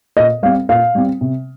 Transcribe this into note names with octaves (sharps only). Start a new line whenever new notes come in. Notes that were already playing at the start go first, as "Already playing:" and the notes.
A#2 D#5
G3 C4 F5
A#2 F5
G3 C4
C3